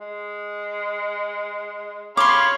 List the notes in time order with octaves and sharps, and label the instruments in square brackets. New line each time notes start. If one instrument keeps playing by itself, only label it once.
[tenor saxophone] G#3
[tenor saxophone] C#4 [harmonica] C#5 F5 B5 [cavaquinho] C6 D6